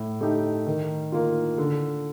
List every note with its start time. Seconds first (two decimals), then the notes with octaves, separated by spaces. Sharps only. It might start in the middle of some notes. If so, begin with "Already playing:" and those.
Already playing: A2
0.21 A3 D#4 G4
0.66 D#3
1.12 A#3 F4
1.58 D3